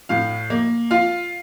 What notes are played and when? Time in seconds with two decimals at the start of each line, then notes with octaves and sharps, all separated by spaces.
0.09 A2 F5
0.50 A#3
0.91 F4 F5